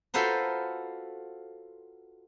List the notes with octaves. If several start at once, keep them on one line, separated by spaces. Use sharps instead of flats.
F4 F#4 A4 B4 C5 A#5